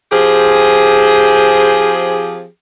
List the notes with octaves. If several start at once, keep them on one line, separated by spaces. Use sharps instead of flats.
F3 C4 G4 G#4